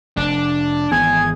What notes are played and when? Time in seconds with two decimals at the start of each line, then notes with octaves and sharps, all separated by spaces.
0.17 F1 D4
0.92 G#1 E3 B3 G#4 G#6